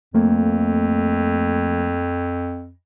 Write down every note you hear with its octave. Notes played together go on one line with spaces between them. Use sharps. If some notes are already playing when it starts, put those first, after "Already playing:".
F2 F3 A3 A#3